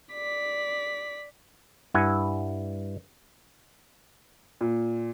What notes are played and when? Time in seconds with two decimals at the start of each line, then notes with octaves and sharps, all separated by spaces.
0.13 D5 B6
1.94 G2 E4 F#5 G#5
4.61 A#2